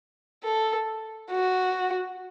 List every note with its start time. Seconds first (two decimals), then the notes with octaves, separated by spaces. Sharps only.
0.44 A4
1.31 F#4